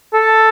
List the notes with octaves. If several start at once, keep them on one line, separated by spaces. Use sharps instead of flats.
A4